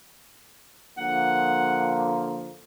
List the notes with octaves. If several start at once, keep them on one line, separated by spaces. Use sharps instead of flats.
D3 F3 A#3 F#5